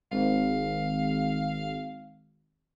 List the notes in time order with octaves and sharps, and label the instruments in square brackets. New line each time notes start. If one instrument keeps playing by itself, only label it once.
[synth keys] G#1 [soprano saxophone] F5